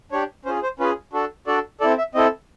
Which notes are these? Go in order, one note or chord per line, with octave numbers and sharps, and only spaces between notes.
D4 G4 C#5
C#4 F4 G#4 C5
C5
C#4 F4 G#4 B4
D4 F#4 A4
D4 F#4 A4 D5
C4 E4 A4 D5
E5
C4 E4 A4 D#5